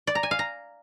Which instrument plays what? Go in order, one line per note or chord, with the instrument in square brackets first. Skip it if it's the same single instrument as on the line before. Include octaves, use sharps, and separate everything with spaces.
[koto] D5
A#5
G#5
F5
A#5